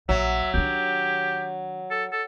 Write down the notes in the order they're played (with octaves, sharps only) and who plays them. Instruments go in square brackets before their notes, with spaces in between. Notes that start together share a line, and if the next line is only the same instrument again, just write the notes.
[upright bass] A#1 [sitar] F#3 [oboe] E5
[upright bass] D#3 D4 [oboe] G4
[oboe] A4
A4